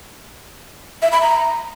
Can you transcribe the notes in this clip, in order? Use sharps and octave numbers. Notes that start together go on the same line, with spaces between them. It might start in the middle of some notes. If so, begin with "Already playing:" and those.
E5
B5
A#5